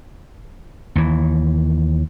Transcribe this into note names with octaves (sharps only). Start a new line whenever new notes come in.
D#2 E3